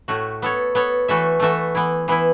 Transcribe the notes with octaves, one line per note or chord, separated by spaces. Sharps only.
A2 A3 F#4
B3 A4 C#5
B3 A4 C#5
E3 A3 F#4 A4 E5
E3 A3 F#4 A4 E5
E3 B3 E4
E3 B3 E4